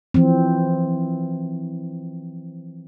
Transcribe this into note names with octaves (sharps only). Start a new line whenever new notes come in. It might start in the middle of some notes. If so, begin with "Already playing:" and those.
E3 F3 C4